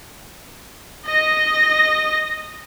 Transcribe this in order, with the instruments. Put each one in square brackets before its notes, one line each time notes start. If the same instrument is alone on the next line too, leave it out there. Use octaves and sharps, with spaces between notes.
[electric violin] D#5 A#6